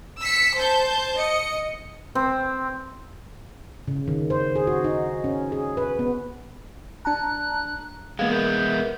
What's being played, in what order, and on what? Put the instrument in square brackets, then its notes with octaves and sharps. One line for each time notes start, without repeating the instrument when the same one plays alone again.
[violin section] E6 B6 C#7
C5 A5 G6
D#5 C#7
[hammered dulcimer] C4
[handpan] C#3
D#3
C5
G#4
F#4
D#4
C#4
G#4
B4
B3
[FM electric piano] D4 A5 A#5 [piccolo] F#6
[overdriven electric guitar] G#3 B3 [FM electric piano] A#3 F5 [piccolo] G#6
[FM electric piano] A#4 E5 [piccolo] G6